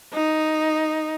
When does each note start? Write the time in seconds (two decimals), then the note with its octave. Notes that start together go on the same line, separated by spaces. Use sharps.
0.13 D#4